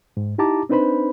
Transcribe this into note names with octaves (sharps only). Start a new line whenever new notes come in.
G#2
D#4 E4 G4 A5 A#5 D6
C4 D4 D#4 B4 C5 B5